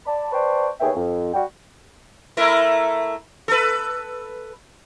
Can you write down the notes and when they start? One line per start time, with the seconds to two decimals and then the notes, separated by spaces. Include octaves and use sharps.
0.06 D5 A5 B5
0.33 B4 C5 D5 G5 A5 C#6
0.81 D#2 B3 G#4 C#5 E5 G5
0.96 F2
1.34 G3 F#4 G5
2.37 A3 E4 A#4
3.48 A4 B4